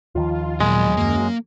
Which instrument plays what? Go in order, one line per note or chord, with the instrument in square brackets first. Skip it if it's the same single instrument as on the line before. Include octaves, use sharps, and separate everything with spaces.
[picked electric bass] D#2 D#3 F3 [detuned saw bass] F4
[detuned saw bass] A#2 [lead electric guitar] F#3 D#5 [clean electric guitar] G#3
[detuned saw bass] F#2 [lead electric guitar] A#3